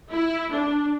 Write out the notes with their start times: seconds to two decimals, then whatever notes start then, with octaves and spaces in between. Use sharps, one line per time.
0.11 E4
0.52 D4